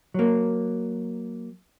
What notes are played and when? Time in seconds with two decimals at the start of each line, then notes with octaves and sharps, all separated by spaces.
0.14 F#3 A#3